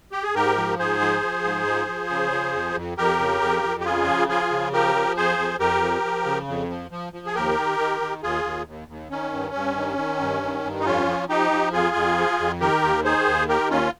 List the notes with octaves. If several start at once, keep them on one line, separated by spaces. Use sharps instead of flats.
G4
G#4
G#2 G4 A#4
F3
G#2 G#4 C5
F3
F3
G#2
F3
F3
C#3
F3
F2
F2
F2 G4 A#4
C#3
F2
F2
G4
C#3 F4 G#4
F3
F3 F4 G#4
C#3
F3 G4 A#4
F3
F2 G#4 C5
F2
F2 G4 A#4
F3
F3
C#3
F2
F3
F3
F3
G#4
D#2 G4 A#4
D#3
D#3
D#3
D#2 F4 G#4
D#2
D#2
D#2
D#3 C#4
G2
G2
D#3
D#3
G2
D#3
G2
D#4
F2 C#4 F4
F3
F3 D#4 G4
F3
F2 F4 G#4
F2
F3
F2
D#3 G4 A#4
D#2
D#3 G#4 C5
D#2
D#3 G4 A#4
D#2 C#4 F4